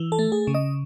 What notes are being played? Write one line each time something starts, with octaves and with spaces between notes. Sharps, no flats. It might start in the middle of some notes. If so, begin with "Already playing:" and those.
Already playing: E3
A4
A3
G#4
C#3
D#5